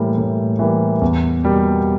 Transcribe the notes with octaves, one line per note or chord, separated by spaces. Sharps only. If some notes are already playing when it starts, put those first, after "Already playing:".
Already playing: A2 E3 G3 A#3
A2
E3 G3 A#3
E2
B2 G3 A#3